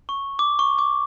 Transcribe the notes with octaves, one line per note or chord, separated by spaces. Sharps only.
C#6
D6
C#6
D6